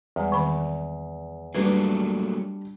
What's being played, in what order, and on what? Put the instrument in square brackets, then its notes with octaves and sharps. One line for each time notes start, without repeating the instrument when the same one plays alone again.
[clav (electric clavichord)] E2 [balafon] G3 G#3
[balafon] D#3 C4 B5
[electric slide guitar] F#3 A3 A#3 [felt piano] G3 D4 [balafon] B4